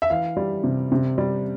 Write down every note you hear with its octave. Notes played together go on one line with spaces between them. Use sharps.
E5
E3 F5
G3
C3
C3
G3